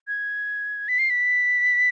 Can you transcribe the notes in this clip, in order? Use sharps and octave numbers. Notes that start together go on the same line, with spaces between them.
G#6
B6
C7
B6